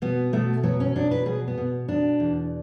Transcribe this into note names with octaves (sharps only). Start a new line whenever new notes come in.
B2 B3
B2 A3
F#3 B3
C#4
B2 D4
B4
B2 G#4
B3
B2
B2 D4
E2